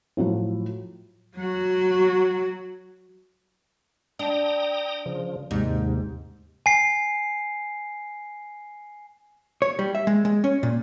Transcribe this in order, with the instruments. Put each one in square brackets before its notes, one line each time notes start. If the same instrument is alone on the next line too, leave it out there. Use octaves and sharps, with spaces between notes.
[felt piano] A2 F3 F#3 F4
[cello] F#3 F#4
[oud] D4 [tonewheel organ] G5 A#5 D#6
[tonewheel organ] C#3 F3
[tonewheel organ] D#2 C3 [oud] G#2
[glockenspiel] G#5 C7
[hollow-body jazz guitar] C#5
G3
E5
G#3
G#3
C#4
A#2